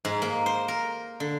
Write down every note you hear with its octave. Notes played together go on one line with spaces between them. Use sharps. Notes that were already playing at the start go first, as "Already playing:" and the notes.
G#2
A#3
C5
A#4
D3